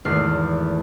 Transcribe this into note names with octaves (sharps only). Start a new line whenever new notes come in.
G#1 E2 A3 F6 C7